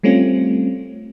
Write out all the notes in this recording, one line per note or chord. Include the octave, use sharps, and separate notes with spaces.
G3 A3 C4 C#4 F4